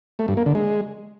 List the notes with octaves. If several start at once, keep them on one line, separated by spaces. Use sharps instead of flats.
A3
G2
A#3
D3
G#3